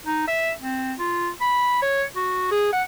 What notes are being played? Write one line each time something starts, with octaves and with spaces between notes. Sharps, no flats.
D#4
E5
C4
F4
B5
C#5
F#4
G#4
F#5